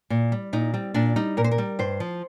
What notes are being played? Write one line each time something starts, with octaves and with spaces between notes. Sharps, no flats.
A#2
G3
A#2 D#4
G3 C4
A#2 D4
G3 D#4
A#2 A#4
C5
A#4
G3
G2 C5
F3